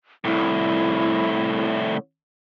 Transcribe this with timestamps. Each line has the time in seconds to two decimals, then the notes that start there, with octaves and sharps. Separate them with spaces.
0.25 C2 A2 E4